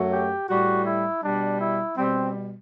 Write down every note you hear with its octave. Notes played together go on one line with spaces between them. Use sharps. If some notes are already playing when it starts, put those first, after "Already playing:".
Already playing: F#2 F#3 A3
G4
A2 G3 F#4
E4
B2 G3 D4
E4
B2 G3 C4